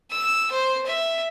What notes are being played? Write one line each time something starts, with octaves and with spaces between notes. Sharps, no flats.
E6
C5
E5